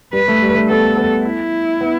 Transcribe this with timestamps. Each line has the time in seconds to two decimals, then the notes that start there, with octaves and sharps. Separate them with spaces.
0.13 G3 B4
0.28 A3
0.42 G3
0.55 A3
0.69 B3 A4
0.97 B3
1.24 E4
1.81 B3